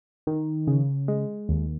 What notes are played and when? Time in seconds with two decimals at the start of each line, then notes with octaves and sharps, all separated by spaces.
0.27 D#3
0.67 C#3
1.08 G#3
1.49 D#2